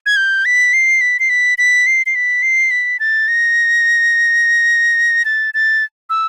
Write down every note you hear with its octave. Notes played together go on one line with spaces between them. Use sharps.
G#6
G6
B6
C7
B6
C7
B6
B6
C7
C7
B6
C7
B6
A6
A#6
A6
A6
E6